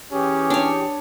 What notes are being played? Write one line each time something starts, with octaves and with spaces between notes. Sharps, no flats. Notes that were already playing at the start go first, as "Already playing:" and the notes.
E3 C#4 G4 G#4
D4 C#5